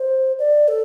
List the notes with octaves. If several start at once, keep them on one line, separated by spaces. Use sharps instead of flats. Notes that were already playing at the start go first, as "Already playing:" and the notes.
Already playing: C5
D5
A4